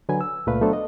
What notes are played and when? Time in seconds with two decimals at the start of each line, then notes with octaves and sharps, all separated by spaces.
0.09 D3 F#3 B4 G#5
0.21 E6
0.47 C#2 A#2 A3 B4 F5
0.61 F#3 A3 B3 D4 A4 C5
0.73 D#5